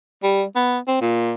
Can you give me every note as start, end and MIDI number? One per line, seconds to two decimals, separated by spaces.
0.23 0.44 55
0.56 0.78 59
0.88 0.99 60
1.02 1.35 46